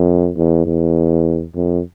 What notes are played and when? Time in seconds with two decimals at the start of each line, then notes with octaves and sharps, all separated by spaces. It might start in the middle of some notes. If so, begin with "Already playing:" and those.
Already playing: F2
0.36 E2
0.66 E2
1.54 F2